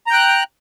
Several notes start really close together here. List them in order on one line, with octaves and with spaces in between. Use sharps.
A#5 G5 F#6